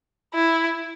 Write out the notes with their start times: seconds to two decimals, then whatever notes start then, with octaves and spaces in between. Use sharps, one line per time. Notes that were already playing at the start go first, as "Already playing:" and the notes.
0.35 E4